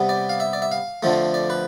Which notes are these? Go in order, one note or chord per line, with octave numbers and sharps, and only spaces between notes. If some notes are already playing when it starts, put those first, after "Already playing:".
Already playing: C3 G3 B3
D5
F5
E5
D5
E5
F5
F2 D3 F3 A3
D5
B4